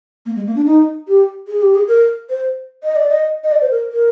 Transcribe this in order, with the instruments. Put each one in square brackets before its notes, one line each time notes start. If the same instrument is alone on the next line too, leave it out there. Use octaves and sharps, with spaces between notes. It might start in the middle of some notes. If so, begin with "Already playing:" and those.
[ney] A#3
G#3
A#3
D4
D#4
G4
G#4
G4
G#4
A#4
C5
D#5
D5
D#5
D#5
D5
C5
A#4
A#4